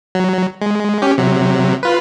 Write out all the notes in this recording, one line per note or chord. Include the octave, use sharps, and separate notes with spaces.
F#3
G#3
C#4 G4
C3 F#3
F4 B4